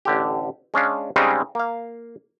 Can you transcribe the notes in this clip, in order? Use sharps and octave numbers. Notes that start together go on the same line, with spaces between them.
A1 D3 G4
G#3 C#4 D4 F5
C#3 G3 G#3 C4 C#4 D#4
A#3 F5